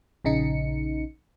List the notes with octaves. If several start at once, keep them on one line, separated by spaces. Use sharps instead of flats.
A#1 C#3 D#4 C#7